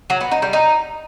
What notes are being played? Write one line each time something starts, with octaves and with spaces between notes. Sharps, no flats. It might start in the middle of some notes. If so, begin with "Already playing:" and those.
F#3
B3
D#4
G3
D#4